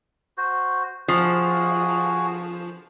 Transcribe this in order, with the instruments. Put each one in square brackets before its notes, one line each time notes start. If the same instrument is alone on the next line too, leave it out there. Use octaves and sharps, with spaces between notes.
[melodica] F#4 C5
[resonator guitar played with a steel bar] F3 [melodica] F#4 G#4